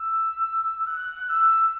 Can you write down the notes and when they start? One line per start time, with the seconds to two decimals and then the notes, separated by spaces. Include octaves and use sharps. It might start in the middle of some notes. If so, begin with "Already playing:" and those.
Already playing: E6
0.86 F#6
1.25 F#6
1.28 E6